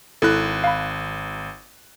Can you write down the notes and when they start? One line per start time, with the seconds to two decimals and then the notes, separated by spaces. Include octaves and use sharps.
0.22 G#1 E4 A4 F#6
0.64 F5 B5